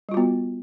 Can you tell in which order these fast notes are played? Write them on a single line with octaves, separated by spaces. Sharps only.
G3 F4 F#4 B3